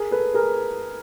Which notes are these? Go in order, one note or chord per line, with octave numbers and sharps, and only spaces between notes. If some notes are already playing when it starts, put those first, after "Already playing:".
Already playing: G#4 A#4
A4 B4
G#4 A#4